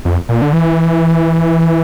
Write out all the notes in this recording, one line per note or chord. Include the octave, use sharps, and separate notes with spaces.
F2
A#2
D3
E3